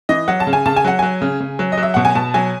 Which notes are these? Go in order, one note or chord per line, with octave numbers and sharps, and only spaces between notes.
E3 D#5
F#3 F#5
A5
C#3
G#5
C#3 A5
G#5
F#3 F#5
F#3 G#5
C#3
C#3
F#3
D#5
F#3
E5
B2 F#5
G#5
B2 A5
F#3 G#5